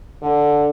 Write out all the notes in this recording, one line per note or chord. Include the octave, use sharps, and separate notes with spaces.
D3